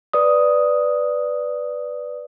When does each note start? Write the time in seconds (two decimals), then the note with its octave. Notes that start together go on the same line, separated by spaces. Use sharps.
0.13 B4 D5 D#6